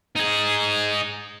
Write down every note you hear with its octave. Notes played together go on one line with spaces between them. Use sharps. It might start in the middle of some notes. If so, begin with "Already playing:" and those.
D#4 G#4